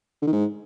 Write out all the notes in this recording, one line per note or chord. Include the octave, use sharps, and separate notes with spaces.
D3
D#3
G#2